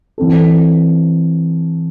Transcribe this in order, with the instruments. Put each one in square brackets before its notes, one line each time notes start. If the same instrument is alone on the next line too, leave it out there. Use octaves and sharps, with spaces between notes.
[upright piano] E3 C4 A4